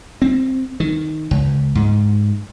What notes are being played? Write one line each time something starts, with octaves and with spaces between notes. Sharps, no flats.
C4
D#3
C#2
G#2